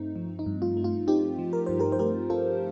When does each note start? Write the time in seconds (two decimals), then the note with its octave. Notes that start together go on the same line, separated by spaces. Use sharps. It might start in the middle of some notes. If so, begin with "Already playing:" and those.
Already playing: G2 A3 C4 D#4
0.16 F3
0.39 D#4
0.46 G2
0.62 F4
0.77 A3
0.84 F4
1.08 C4 D#4 G4
1.39 F3
1.53 A#4
1.66 G2 C5
1.80 G4 A#4
1.92 C5
1.99 A3 G4 A#4
2.30 C4 F4 A4